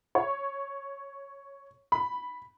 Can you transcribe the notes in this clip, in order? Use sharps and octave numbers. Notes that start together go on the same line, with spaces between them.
C#5
B5